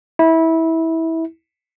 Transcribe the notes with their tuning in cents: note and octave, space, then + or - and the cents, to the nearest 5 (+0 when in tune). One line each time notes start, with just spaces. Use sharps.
E4 -20